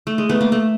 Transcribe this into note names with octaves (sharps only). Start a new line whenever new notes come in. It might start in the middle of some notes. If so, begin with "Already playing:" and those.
A3
G#3
A3 B3
A#3
A3